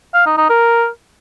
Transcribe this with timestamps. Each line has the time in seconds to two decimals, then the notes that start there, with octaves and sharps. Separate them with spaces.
0.14 F5
0.26 D#4
0.38 D#4
0.49 A#4